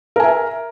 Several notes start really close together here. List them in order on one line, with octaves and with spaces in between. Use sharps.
A#4 G#5 E5